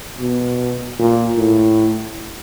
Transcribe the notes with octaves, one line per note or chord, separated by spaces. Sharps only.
B2
A#2
A2